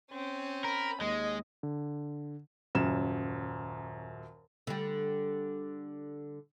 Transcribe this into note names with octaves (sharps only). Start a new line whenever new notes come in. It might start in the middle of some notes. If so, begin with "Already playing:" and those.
C4 C#4
A#4 B5
D#2 G#3 D#5
D3
D#1 F#2 C#3 E7
D3 G3